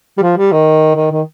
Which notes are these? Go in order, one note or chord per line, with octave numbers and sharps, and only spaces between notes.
G3
F3
G3
D#3
D#3
D#3